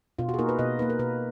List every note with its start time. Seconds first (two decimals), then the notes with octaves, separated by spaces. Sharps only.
0.19 B2 F4
0.29 F#4
0.34 G#4
0.39 A#3 D#4 A#4
0.49 B4
0.59 B2 D#5
0.79 A#3 D#4 B4
0.90 A#4
0.99 B2 B4